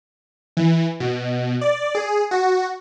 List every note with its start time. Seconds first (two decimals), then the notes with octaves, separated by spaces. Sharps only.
0.57 E3
1.00 B2
1.61 D5
1.95 G#4
2.31 F#4